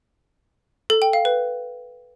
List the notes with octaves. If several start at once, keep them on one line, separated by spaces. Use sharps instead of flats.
A4
G5
F5
B4